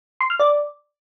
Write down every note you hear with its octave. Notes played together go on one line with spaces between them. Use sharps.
C6
F6
D5